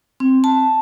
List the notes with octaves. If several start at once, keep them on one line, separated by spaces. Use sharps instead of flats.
C4
A5